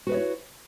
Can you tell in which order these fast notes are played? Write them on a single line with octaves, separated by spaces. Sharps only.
F#4 B4 D#5 C#5 E4